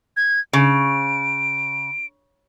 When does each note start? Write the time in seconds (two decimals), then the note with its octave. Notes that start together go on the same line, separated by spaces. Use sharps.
0.17 G#6
0.53 C#3 D7